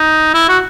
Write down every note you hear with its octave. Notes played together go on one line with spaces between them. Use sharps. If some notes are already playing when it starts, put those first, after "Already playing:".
Already playing: D#4
E4
F#4